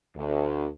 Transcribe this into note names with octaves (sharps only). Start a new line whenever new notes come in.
D2